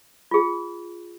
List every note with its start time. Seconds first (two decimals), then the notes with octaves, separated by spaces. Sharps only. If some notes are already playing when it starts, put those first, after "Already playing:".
0.31 F4 G#4